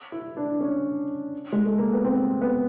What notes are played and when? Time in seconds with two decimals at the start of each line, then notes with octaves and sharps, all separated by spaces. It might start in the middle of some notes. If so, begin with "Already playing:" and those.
0.12 E4
0.37 D4
0.61 C#4
1.52 G#3
1.66 A3
1.78 A#3
1.93 B3
2.04 C4
2.41 B3